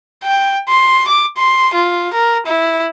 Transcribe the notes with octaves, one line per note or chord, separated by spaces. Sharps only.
G5
C6
D6
C6
F4
A#4
E4